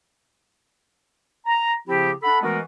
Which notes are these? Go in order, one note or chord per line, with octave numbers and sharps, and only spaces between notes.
A#5
C#3 F3 C4 E4 G4
D4 A4 F#5 B5
E3 G#3 A3 B3 F#4 A#4